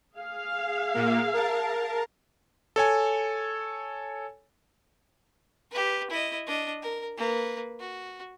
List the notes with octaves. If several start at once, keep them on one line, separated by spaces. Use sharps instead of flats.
G#4 F5
A#2 A#3
A#4 A5
A4 C#5 G#5
G4 B4
E4 D#5
D4 D#5
A#4
A#3 B4
F#4